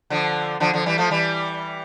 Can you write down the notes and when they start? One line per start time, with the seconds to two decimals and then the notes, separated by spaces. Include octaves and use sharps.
0.10 D3 F3
0.60 D3 F3
0.73 D3 F3
0.86 E3 G3
0.98 F3 A3
1.11 E3 G3